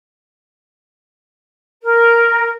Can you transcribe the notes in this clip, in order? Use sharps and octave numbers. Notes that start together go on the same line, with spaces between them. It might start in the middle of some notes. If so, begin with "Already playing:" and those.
A#4